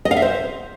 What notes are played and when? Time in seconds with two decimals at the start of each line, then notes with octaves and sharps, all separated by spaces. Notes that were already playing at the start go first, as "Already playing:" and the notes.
0.05 D#5
0.11 F5
0.17 E5
0.22 C5